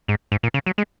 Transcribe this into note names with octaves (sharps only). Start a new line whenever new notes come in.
G#2
G#2
A#2
C#3
F#3
G#3